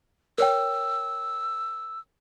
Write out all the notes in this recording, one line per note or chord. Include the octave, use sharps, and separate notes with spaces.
A#4 C#5 G5 E6